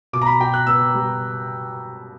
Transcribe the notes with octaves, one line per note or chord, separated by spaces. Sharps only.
B2 D6
A#5
B5
B2 G5
F#6
B3 E6
G3